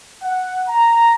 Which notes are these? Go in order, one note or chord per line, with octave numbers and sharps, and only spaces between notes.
F#5
A#5